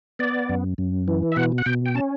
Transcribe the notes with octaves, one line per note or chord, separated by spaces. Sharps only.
B3 D5
F#2
F#2
E3
E5
B2 F#5
F#5
B2 G5
G5
C#4 A5